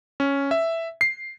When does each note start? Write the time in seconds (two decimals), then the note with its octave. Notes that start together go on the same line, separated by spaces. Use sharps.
0.20 C#4
0.51 E5
1.01 C7